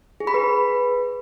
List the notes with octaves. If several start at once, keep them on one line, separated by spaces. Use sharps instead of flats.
G#4
B5
B4